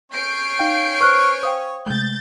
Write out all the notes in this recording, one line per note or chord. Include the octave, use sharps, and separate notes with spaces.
C#4 C#5 G6 C7 D7
D#4 F5 G5
B4 C5 C#6 F6 F#6
C5 F5 G5 D#6
C3 G#3 A3 G6 A6